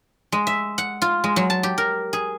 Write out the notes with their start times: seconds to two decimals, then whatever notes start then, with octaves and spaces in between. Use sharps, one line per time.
0.32 G#3
0.47 E5
0.78 F#5
1.02 F4
1.24 G#3
1.36 F#3
1.50 A5
1.63 G4
1.78 A#4
2.13 G#4